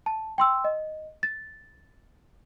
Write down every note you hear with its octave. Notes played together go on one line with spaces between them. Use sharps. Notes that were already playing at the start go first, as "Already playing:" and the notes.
A5
G5 C6 E6
D#5
A6